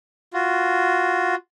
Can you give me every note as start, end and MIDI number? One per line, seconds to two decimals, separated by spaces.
0.33 1.35 65
0.33 1.35 66